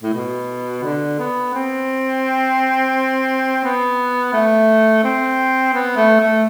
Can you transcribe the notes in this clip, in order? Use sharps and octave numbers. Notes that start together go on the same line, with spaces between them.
A2
B2
D3
B3
C4
B3
A3
C4
B3
A3
A3